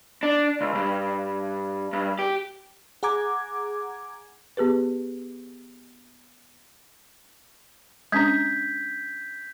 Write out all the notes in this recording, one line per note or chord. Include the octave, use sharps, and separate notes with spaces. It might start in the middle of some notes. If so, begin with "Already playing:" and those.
D4
C#2
G2
G2
G4
G#4 F#5 A#5 D6 G#6
B3 G4 G#4 B4
G#3 C#4 D4 G6 G#6 B6